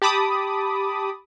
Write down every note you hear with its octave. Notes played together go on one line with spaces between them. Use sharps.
G4 A5 B5 D6 D#6